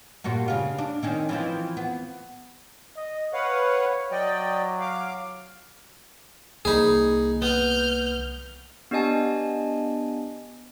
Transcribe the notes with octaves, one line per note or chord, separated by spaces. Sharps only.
G2 A#2 F#4
C#3 F4
D4
D#3 C4 C#4
E3 F3 C4
B3
D#5
B4 C#5 F5 F#5
F#3 D5 D#5 G5
F5 D6
C2 A#3 D#4 G#4 B5
B3 F6 G6
B3 D4 G4 D#5 G#5 A5